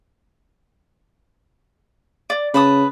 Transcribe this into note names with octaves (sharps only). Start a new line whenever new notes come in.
D5
C#3 B4 A5 D#6